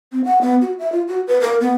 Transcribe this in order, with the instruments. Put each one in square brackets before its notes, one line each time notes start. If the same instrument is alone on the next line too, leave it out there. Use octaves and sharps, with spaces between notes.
[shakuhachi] C4
F#5
B3
F#4
E5
F4
F#4
B4
A#4
B3